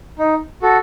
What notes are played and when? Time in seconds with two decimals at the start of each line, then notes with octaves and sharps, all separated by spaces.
0.19 D#4
0.62 F#4 A4